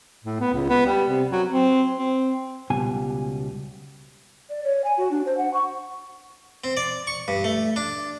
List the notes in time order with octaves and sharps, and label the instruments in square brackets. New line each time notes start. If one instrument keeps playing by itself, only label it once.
[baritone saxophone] A2
B3
C#2
B3
G3
C3
F#3
C4
C4
[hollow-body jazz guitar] C#2 B2 G3 G#5
[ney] D5
C#5
G#5
F#4
D4
C5
F#5
C#6
[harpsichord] C4
D5
C#6
G2
A3
D4